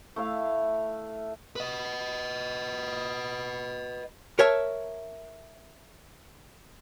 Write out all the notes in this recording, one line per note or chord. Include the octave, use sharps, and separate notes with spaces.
A3 E4 F5
B4 D#5
A#4 C#5 E5 A5